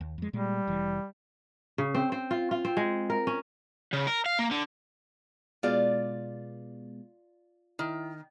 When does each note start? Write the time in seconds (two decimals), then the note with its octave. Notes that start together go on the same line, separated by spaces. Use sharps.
0.01 D#2
0.18 F2 G#3
0.33 A#2 G3 G#3
0.67 F1 E3
1.78 C#3
1.95 C4
2.12 C4
2.31 F4
2.51 F4
2.65 C4
2.77 G#3
3.10 A#4
3.27 C#4
3.93 C#3
4.07 A#4
4.26 F5
4.39 A#3
4.51 D3
5.63 B2 G#3 B3 F4 D5
7.79 D#3 E4